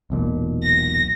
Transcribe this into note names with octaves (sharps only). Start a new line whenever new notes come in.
E1 B1 A#2
A#6